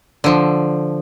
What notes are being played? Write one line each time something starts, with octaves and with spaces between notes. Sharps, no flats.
D3 F3